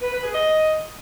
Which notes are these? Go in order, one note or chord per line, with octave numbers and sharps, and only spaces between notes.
B4
B4
G#4
D#5